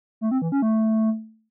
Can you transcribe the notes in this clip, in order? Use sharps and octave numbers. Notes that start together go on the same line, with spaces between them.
A3
C4
E3
C#4
A3